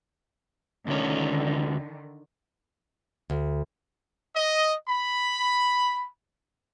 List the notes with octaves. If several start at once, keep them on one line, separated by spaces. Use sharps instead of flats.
D2 D3 D#3 C#4
D2
D#5
B5